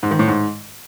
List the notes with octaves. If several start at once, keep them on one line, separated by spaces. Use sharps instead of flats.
G#2
D#3
A2
G#2